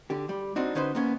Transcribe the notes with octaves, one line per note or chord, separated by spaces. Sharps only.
D3 G4
G3
C4 D4 D#4 F#4
D3 C#4 D#4 B4 C5
A#3 B3 C#4